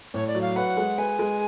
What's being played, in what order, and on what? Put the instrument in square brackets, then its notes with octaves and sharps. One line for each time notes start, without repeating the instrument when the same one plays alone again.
[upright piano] A2 [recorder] C#5
[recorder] D5
[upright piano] F#3
[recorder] F5
[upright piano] B4 [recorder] F#5
[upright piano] G#3
[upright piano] B4 [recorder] G#5
[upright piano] G#3